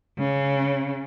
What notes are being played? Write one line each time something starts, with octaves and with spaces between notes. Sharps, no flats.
C#3